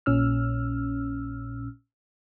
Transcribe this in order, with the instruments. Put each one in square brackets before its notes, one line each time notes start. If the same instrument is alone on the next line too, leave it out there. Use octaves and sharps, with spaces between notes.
[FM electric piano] A#1 A#2 C#4 E6 F6